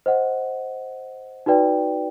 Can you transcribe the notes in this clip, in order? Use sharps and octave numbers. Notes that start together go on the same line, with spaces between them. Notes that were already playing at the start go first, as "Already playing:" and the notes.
C5 D#5 F#5
D#4 F#4 B4 D5 G5